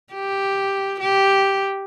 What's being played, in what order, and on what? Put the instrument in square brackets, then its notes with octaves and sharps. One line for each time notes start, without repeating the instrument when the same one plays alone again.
[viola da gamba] G4
G4